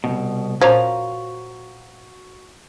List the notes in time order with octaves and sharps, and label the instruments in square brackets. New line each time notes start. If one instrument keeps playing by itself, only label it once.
[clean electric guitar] C2 G2 B2
[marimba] A#2 C5 G#6 [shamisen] F3 C#4 [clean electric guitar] F#4 A#5